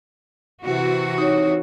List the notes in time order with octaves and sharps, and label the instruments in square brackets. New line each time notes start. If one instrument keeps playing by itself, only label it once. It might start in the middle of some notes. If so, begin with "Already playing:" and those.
[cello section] C3 E3 F#4
[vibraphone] D#4 C#5